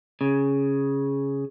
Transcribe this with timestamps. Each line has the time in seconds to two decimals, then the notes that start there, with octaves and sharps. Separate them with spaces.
0.21 C#3